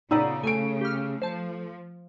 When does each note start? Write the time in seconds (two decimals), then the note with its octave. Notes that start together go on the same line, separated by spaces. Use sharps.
0.11 A#2 C#3 B3 D#4 D5 A#5 E6
0.43 A3 G#5 D7
0.81 G4 F6
1.22 F3 C5 A5